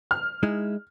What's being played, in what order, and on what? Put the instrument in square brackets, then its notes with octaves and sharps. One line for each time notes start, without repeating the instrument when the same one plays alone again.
[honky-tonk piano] F6
[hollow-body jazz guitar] G#3 D#4 E4